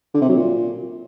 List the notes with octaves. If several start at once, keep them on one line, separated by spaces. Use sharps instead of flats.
D3
C3
F#3
A#2